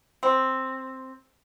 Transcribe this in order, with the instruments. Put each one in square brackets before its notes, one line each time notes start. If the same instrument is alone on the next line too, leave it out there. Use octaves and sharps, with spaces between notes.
[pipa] C4